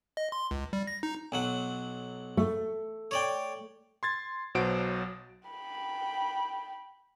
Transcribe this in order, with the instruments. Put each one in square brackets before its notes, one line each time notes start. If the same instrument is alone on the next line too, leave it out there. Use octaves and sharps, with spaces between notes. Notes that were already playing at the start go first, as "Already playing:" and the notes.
[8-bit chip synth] D#5
C6
C#2
G3
A#6
D#4
[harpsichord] B1 F#3 F#5
[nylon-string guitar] A3
[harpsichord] C#5 D5 G5
[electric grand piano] C6 G#6 A6
B1 B2 F#3 C5 F#5 D7
[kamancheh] G5 B5